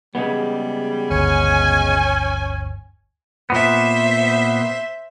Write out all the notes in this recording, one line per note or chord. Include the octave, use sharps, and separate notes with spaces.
C#3 G3 G#3 B3
G1 D2 C#4 G#5
A#2 B3 C5 E5